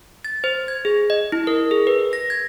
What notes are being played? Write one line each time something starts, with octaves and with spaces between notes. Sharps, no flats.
A6
C5
G#6
G#4
D#5
E4
A#4
G#4
B4
A#6
G#6